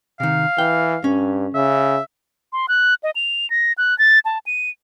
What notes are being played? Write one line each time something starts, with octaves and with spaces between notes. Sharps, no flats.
C3 D#3 F5
E3 G5
G2 C#4
C#3 E5
C6
F#6
D#5
F7
A#6
F#6
A6
A5
D#7